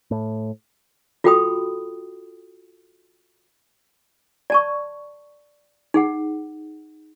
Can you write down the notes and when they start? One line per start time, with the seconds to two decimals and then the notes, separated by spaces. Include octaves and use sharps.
0.11 A2
1.24 F4 F#4 A4 G5 B5 D#6
4.50 D5 A5 C#6
5.94 D#4 G#4 F#5